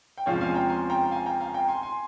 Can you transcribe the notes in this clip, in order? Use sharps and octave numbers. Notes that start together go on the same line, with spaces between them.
G5
E2 C3 F3 G#3 C#4 C#5 F5
F5 G#5
G5 A#5
G#5 C6
G5 A#5
F5 G#5
G5 A#5
F5 G#5
G5 A#5
G#5 C6
G#5 C6